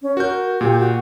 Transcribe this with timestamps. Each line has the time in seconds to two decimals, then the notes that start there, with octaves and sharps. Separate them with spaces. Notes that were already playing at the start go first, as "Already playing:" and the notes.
0.02 C#4
0.17 F#4 A#4 G6
0.61 A#2 G4
0.80 F#4